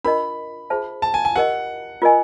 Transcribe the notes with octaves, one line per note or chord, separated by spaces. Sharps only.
D4 F4 A#4 D#5 B5
F4 G#4 C5 E5 A5
A5
G#5
G#5
G4 A#4 D#5 F#5
F4 A#4 D#5 G#5